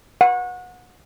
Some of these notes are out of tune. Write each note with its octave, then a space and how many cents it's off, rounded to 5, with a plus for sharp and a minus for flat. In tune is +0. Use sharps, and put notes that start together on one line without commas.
F#5 -30